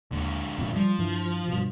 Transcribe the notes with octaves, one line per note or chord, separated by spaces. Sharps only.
D#2 D3 G#3
F2 A#2
F3 G3
G2 E3
G2 B2